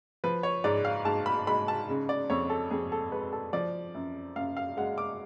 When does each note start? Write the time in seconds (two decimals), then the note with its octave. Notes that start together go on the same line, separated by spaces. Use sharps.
0.24 F3 B4
0.43 C#5
0.64 G#2 D5
0.85 F5
1.05 G#2 A5
1.26 B5
1.47 G#3 B5
1.68 A5
1.89 C#3
2.09 D5
2.30 F2 C#5
2.50 A4
2.70 F2 G#4
2.92 A4
3.12 G#3 B4
3.33 A4
3.53 F3 D5
3.95 F#2
4.36 F#2 F5
4.57 F5
4.77 G#3 F#5
4.98 D6